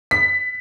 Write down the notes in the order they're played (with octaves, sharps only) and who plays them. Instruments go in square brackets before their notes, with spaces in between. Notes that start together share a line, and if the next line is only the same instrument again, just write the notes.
[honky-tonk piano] B6